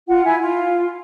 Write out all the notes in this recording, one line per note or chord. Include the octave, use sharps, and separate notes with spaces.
F4 F#5
E4 G#5
F4